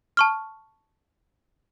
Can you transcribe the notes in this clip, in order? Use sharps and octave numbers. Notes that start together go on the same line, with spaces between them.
A5 C#6 F6